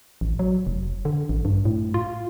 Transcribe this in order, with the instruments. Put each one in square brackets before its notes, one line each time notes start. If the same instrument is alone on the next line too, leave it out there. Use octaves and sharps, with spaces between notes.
[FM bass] A1
F#3
F1
D3
A1
G2
A2
F4